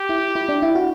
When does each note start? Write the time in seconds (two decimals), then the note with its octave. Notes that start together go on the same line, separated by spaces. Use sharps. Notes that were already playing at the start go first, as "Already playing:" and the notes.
Already playing: G4
0.09 E4
0.35 E4
0.49 D4
0.62 E4
0.75 F#4